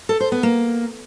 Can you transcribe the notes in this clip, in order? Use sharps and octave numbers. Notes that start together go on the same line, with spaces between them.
A4
C5
B3
A#3